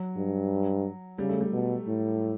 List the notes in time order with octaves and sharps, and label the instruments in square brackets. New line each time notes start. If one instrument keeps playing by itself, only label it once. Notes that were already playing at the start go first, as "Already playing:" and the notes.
Already playing: [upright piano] F#3
[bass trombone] G2
[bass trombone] C#3 [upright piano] G3
[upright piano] A3
G3
[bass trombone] B2
A2